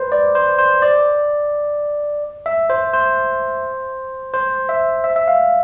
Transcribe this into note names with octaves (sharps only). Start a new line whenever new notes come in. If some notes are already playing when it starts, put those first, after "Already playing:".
Already playing: B4 C5
D5
C5
C5
D5
E5
C5
C5
C5
E5
E5
E5
F5